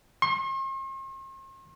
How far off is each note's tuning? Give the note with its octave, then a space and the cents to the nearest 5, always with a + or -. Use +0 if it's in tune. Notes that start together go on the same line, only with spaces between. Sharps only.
C6 +45